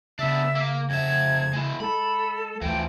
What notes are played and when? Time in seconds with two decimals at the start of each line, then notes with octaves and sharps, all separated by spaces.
0.19 C#3 B3 D4 E5
0.55 A#3
0.90 F2 E5 G#6
1.53 G#3 E4
1.80 G#3 A4 B5
2.61 D2 E3 F3 G5